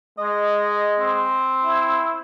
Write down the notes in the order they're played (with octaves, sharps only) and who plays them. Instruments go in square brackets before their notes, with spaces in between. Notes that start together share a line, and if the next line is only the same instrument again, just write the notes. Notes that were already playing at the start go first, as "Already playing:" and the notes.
[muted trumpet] G#3 [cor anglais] D#5
[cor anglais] C4
[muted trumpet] E4